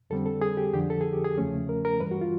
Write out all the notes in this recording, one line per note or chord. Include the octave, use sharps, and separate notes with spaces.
F2 D3 G3 C4 A4
A4
G#4
G4
F2 D3 F3 G4
A4
G#4
G4
G#4
E2 C#3 F3 A3 C#4
A#4
A#4
G2 E3 G3 B4
F#4
F4